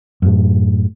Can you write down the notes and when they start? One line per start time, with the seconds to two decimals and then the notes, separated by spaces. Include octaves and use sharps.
0.22 F#2 A2